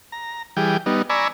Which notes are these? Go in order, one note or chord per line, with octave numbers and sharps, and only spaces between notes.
A#5
E3 G3 G#4 G5
G3 B3 D#4
D5 G#5 A#5 B5 C#6 E6